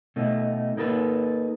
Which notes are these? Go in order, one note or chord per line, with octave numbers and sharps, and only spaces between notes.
B2 A3 D#4
A#3 D#4 A4 B4